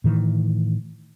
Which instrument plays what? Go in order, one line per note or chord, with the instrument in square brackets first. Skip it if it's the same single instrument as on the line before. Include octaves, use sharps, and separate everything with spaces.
[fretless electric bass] A2 D#3 E3